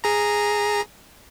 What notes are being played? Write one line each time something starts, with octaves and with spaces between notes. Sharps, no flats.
G#4 A#5